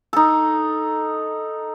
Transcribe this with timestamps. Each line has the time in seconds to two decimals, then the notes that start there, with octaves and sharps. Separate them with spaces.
0.13 D#4 A4